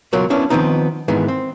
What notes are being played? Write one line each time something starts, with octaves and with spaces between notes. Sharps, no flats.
C#2 B2 F#3 F4 A#4
B3 C#4 D4 E4
D#3 F3 B3 C4 D#4
G#2 D#3 E3 G#3 B3
C4